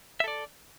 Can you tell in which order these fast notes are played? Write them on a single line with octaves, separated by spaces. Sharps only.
E5 A4 D5